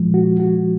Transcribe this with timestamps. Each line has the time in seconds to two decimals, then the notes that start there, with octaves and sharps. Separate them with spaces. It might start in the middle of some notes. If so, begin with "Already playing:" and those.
Already playing: A#2 F3 G#3
0.14 F#4
0.40 F#4